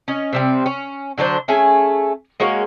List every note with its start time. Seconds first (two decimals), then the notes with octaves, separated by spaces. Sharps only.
0.08 C#4 D#5
0.33 C3 G3 C4
0.66 C#4
1.18 D3 F#3 D4 C5
1.48 A3 C#4 G#4 G#5
2.40 G#3 A#3 C#4 F#4